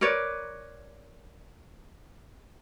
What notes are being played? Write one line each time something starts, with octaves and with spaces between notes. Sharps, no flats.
A#4 B4 C#5 D5